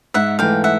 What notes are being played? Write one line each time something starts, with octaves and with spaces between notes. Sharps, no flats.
G#2 E5 F#5
E3 A3 F5 G5
E5 F#5